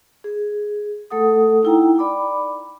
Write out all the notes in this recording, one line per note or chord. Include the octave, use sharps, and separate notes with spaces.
G#4
A3 A4 F#5 D#6
D#4 E4 G5 A#5
D5 B5 D6